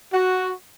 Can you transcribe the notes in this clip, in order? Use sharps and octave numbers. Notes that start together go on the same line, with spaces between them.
F#4